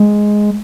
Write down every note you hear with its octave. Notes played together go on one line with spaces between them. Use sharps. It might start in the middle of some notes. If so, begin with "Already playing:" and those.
Already playing: G#3